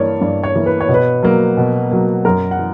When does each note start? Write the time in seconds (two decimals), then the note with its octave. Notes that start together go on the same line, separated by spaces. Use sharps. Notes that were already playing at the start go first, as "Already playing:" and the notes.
Already playing: G2 E3 A#3 C#5 D5
0.21 G2 D5
0.43 C#5
0.55 E3 A#3
0.66 B4
0.81 C#5
0.89 B2
0.94 B4
1.23 F#3 A#3
1.57 B2
1.91 F#3 A#3
2.25 F#2 A#4
2.51 F#5
2.59 E3